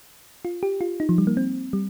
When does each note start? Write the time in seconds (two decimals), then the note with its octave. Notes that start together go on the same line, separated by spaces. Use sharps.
0.45 F4
0.63 G4
0.81 F4
1.00 D#4
1.09 F3
1.18 G3
1.27 A#3
1.37 C4
1.73 G3